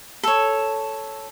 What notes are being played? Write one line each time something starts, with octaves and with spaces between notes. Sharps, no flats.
A4 C#5